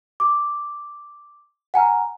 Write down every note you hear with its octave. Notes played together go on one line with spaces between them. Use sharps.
D6
F#5 G#5 A#5 F6